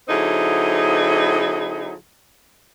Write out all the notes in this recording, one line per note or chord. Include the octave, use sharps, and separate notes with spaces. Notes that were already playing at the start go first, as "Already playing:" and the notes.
D3 F#3 C4 D#4 E4 G#4